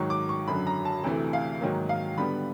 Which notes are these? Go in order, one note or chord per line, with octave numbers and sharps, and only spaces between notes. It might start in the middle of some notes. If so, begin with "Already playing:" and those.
Already playing: G#2 D#3 F#3 C#6
D6
C#6
F#2 D3 F#3 B5
A#5
A5
D2 C3 E3 A3
F5
G#2 D#3 F#3 A#3
F5
D3 G3 B3 B5